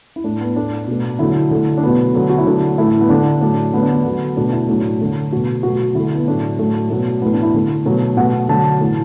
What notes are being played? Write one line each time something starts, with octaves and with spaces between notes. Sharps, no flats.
E4
A2 A3 D4
B3
A2 A3 D4
B2 A3
D3 F#3 A3 E4
D3 A3
D4
B2 F#3 A3 B3
D3 F#3 A3
F#4
E4
D3 F#3 A3 D4
A2 E3 A3 E4
B3
D3 A3 D4
A2 F#3 A3 D4
D3 F#3 A3 B3
D4
B3
D3 F#3 A3
B2 A3 D4
E4
A2 F#3 A3 D4
D3 F#3 A3
B2 A3 F#4
B2 F#3 A3 F#4
D3 F#3 A3 E4
B3
A2 F#3 A3 D4
A2 F#3 A3
B2 F#3 A3
A2 E3 A3 B3
D4
E4
D3 A3
B2 F#3 A3
B2 F#3 A3 F#5
D3 F#3 A3 A5
A2 E3 A3